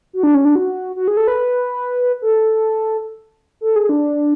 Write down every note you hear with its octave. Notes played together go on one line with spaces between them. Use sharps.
F#4
D4
C#4
D4
F#4
F#4
G#4
A4
B4
A4
A4
G#4
D4